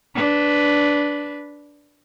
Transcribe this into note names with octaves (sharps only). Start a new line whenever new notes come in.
D4 B4